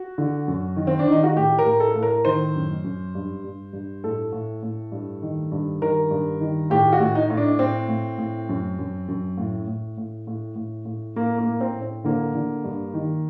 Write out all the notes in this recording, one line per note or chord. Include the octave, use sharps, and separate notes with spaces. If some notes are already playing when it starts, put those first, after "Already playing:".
Already playing: F#4
D3
F#2
D#3
C4
D4
D#3
D#4
F#4
A2 G4
A#4
A2
A4
A2
A#4
D#3 C5
F#2
F#2
G2
G2
G2
A2 A4
A2
A2
G2
D#3
G2
D#3 A#4
G2
D#3
A2 G4
F#4
A2
D#4
A2
D4
A2 C4
A2
A2
F#2
F#2
F#2
A2
A2
A2
A2
A2
A2
A2 A#3
A#3
A2
C4
A2
C4
D3 A#3
D3
G2
D#3